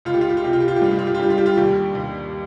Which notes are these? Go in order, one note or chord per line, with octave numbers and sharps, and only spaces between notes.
C#2 F4
G4
F4
G4
F4
C3 G4
F4
G4
F4
G4
G2 F4
G4
F4
G4
F4
G3 G4
F4
G4
F4
D#2 G4
D#2